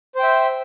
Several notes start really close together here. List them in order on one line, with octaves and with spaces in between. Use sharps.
C5 G5 E5